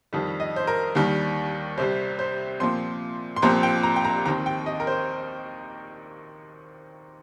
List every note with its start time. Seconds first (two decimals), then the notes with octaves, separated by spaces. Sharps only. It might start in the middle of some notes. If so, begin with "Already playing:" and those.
0.13 F2 D#3 G3
0.40 D#5
0.56 C5
0.67 A#4
0.95 D#2 D#3 G3
1.78 C2 C3 G3 C5
2.19 C5
2.60 A#2 F3 C4 C6
3.36 C6
3.42 C2 A#2 F3 C4 A#5
3.63 G5
3.83 A#5
3.96 G5
4.05 A#5
4.25 D#2 D#3 C4 A#5
4.46 G5
4.66 D#5
4.80 A#4
4.87 C5